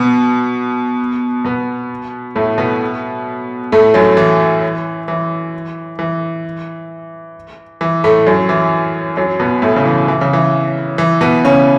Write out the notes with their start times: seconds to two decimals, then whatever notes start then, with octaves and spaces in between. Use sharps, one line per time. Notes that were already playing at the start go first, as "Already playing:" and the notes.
Already playing: B2 B3
1.45 B2 B3
2.35 A2 A3
2.58 B2 B3
3.72 A2 A3
3.94 F#2 F#3
4.17 E3
5.08 E3
5.99 E3
7.81 E3
8.04 A2 A3
8.27 F#2 F#3
8.49 E3
9.17 F#2 F#3
9.40 B2 B3
9.62 A2 A3
9.76 C#3
9.85 E3
10.08 E3
10.21 C#3
10.33 E3
10.98 E3
11.21 B2 B3
11.44 C#3 C#4